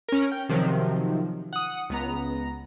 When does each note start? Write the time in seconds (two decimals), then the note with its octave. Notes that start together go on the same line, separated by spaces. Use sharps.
0.09 C#4 A#4
0.32 G5
0.49 C3 D#3 F3 F#3
1.53 F#5 D#6
1.90 C#2 B3 A#5